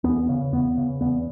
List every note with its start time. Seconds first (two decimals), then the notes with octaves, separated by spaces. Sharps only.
0.04 E2 B3
0.29 C#3
0.52 E2 B3
0.77 C#3
1.01 E2 B3